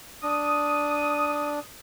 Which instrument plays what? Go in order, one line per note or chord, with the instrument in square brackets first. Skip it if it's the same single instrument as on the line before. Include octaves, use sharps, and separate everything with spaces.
[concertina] D4 [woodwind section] D#6